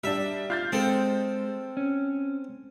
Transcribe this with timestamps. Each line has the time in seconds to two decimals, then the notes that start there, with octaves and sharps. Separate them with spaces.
0.04 G3 D4 E5
0.50 F4 F6 G6 A6
0.72 G#3 C4 A4
1.77 C#4